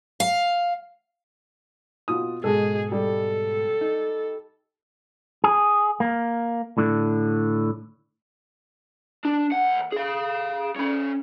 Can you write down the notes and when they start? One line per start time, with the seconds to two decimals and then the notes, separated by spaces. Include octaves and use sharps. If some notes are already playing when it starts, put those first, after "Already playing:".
0.20 F5
2.08 B2 F4 D#6
2.44 G#2 B2 G#3 G#4 A4
2.92 G3 A4
3.81 D#4
5.44 G#4
6.00 A#3
6.78 A2 D3
9.25 D4
9.52 D#2 F#5
9.93 G#4 F5
10.76 C#4 B5